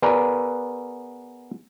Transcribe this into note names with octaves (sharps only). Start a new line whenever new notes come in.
B3 G#4 A#4 B4 D5